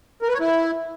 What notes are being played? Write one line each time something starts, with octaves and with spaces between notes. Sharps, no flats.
A#4
B4
C#5
E4